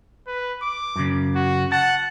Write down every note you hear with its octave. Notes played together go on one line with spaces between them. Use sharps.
B4
D6
F#2 C#3
F#4
F#5 A5